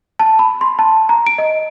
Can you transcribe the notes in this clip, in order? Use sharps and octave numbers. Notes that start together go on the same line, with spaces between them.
A5
B5
C6
A5
A#5
D7
D#5